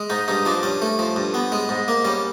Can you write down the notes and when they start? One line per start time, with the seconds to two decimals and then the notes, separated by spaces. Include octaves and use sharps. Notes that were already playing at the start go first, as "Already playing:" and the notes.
Already playing: G#3
0.10 G#2 D#4
0.28 G2 D#4
0.45 F3 D4
0.63 G2 C#4
0.82 A3
0.99 F3
1.16 G2
1.34 B3
1.52 G#3
1.69 G#2
1.88 A#3
2.05 G3 C#4